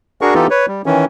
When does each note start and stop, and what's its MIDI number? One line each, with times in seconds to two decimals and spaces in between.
0.21 0.34 62
0.21 0.34 66
0.21 0.34 68
0.21 0.34 70
0.21 0.34 85
0.34 0.47 52
0.34 0.47 59
0.34 0.47 63
0.34 0.47 65
0.34 0.47 67
0.34 0.47 69
0.50 0.66 71
0.50 0.66 73
0.68 0.82 55
0.86 1.05 51
0.86 1.05 52
0.86 1.05 61